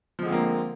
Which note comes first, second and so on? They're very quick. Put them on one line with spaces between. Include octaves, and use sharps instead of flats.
F3 G#3 D3 C4 A#3